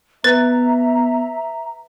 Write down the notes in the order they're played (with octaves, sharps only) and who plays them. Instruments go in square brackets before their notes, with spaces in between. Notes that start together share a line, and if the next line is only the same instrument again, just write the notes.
[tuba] B3 [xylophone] B4 A6 [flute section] E5 A#5